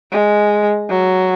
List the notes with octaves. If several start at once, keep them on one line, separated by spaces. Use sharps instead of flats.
G#3
F#3